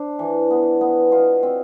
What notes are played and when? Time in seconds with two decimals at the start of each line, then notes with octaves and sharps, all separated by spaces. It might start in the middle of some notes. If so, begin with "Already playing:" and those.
Already playing: D4 C5
0.19 E3
0.50 B3
0.81 B3
1.11 B2 F4
1.43 C4